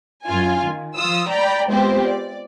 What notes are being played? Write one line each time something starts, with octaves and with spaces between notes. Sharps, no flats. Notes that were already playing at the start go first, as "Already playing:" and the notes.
F#2 F4 G#5
D#3
F3 F4 D#6 E6
D5 G5 A#5 B5
G#3 B3 C4 F4 G4 C5
D5